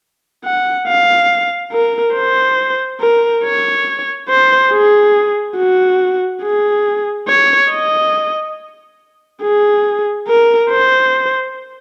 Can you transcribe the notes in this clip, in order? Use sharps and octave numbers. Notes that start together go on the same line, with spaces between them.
F#5
F5
A#4
C5
A#4
C#5
C5
G#4
F#4
G#4
C#5
D#5
G#4
A#4
C5